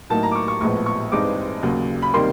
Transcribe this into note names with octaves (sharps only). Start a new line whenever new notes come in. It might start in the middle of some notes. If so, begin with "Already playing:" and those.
A2 F#3 A#3 D#4 A5
A#5
D6
C#6
C#6
A#1 A2 F3 G#3 B3 C#6
C#6
G2 E3 G#3 C4 D#4 D6
D#2 C#3 F#3
B5
C3 D#3 G3 A#3 C6